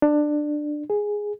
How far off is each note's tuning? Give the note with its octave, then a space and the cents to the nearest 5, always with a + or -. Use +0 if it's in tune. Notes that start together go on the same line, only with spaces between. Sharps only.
D4 +15
G#4 -5